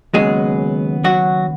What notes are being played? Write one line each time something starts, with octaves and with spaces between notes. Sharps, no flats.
D#2 C#3 F#3 G#3 B3 G#4
F#3 F#4